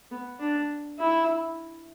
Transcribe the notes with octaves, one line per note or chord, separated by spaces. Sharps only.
B3
D4
E4